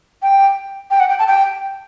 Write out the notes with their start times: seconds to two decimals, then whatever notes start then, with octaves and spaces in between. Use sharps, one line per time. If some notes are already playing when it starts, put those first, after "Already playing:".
0.22 G5
0.91 G5
1.00 F#5
1.09 G5
1.19 A5
1.28 G5